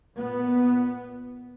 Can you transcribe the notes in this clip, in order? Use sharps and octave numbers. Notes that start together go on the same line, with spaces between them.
A#2 B3